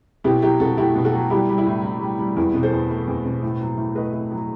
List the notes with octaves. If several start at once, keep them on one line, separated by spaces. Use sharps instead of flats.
B2 E4 G4
F#3 E4 G4
B2 F#4 A4
A3 E4 G4
B2
F#4 A4
F#3
G3 E4 G4
G3
E4
A2
A2
G3
G3
E2 E4
B2
A4 C5
E2
A3
E2
B2
A2
F#3
A2
A3 B4 D#5
A2
F#3